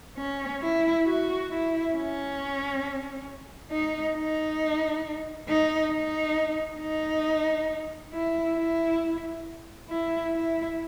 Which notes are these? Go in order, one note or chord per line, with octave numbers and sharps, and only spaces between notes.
C#4
E4
F#4
E4
C#4
D#4
D#4
D#4
D#4
D#4
E4
E4
E4
E4